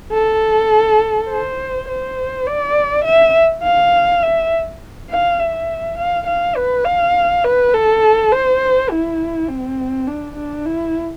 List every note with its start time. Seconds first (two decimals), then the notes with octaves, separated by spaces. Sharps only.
0.13 A4
1.30 C5
1.89 C5
2.47 D5
3.05 E5
3.64 F5
4.23 E5
5.10 F5
5.40 E5
5.98 F5
6.27 F5
6.56 B4
6.85 F5
7.44 B4
7.73 A4
8.31 C5
8.90 E4
9.49 C4
10.08 D4
10.36 D4
10.66 E4